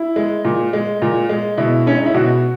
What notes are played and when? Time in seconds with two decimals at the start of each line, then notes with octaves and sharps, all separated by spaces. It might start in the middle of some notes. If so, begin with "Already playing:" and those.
Already playing: E4
0.16 G#3
0.45 A#2
0.73 G#3
1.02 A#2
1.29 G#3
1.58 B2 E4
1.87 G#3 C#4
1.97 D#4
2.06 E4
2.14 B2 F#4